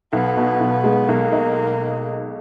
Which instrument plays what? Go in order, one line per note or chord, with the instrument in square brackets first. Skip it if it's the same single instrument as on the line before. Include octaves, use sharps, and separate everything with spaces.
[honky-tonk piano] B1 [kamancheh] B3
[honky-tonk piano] B2
B1
G#3
[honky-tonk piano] B1 [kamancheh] A#3
[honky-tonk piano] D#4